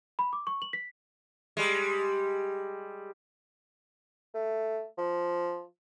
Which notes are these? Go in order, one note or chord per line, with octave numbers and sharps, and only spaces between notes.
B5
D6
C#6
F#7
B6
G3 G#3
A3
F3